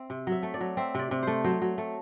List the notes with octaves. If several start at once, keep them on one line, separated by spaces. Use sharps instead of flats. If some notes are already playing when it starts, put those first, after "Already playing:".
Already playing: C4 E5
C3
F#3 E5
A3
D5
F#3
C4 E5
C3 D5
C3
A3 C5
F#3 C5
F#3
A3